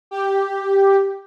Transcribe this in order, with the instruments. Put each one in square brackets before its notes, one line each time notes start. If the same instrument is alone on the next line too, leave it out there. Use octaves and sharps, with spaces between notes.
[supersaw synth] G4